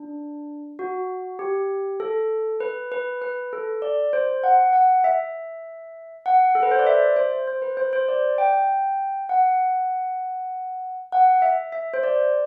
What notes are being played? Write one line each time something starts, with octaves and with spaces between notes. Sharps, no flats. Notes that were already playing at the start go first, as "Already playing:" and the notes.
Already playing: D4
F#4
G4
A4
B4
B4
B4
A4
D5
C5
F#5
F#5
E5
F#5
A4
B4
C5
D5
E5
C5
C5
B4
C5
C5
D5
G5
F#5
F#5
E5
E5
C5
D5